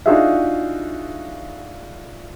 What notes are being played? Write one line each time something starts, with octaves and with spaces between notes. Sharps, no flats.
D4 D#4 F4 F#4 G#4 E5